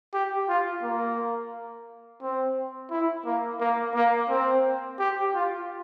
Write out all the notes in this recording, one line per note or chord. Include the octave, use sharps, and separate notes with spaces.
G4
F4
A#3
C4
E4
A#3
A#3
A#3
C4
G4
F4